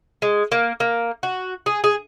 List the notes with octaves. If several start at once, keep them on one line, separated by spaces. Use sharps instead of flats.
G#3
A#3
A#3
F#4
G#4
G#4